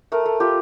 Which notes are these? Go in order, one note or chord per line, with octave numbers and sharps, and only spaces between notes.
A3 A#4
A3
F4 G4